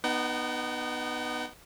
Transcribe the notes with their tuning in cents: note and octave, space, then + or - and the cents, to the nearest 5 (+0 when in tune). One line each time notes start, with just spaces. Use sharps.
B3 -5 D#4 -25 F#5 +45